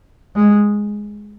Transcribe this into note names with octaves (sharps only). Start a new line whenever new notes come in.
G#3